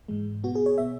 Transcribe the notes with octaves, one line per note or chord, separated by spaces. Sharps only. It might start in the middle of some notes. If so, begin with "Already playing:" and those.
G#2 E3 G#3
B2 B3 F#4
G#4
C#5
B2 B3 E5